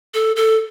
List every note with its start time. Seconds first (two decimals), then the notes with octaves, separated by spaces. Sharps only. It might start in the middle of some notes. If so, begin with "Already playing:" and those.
0.14 A4
0.36 A4